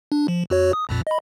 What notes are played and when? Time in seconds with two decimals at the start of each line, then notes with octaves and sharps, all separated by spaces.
0.12 D4
0.28 F3
0.50 F2 F#4 C#5
0.73 D#6
0.89 A#1 F2 A#2
1.07 D#5 B5